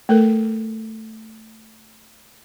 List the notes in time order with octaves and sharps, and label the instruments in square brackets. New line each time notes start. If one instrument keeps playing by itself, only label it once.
[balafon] A3 A4 A#4